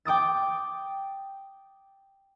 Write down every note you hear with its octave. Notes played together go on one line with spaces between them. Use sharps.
G5 D6 D#6 A6